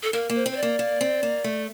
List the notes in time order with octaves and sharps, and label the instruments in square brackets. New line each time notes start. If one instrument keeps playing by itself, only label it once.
[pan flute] A4
[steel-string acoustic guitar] A#3 [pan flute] A#4
[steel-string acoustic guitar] A#3
[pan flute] C5
[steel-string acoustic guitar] C4
[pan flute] C5
D5
[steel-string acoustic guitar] A#3
A#3
C4
A#3
A3